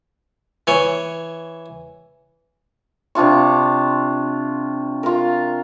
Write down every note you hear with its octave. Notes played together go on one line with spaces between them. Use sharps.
E3 C#5
C3 D4 F4 C#6
F4 A#4